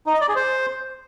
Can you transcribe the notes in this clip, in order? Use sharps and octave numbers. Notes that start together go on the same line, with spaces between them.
D#4
D#5
D5
G#4
C5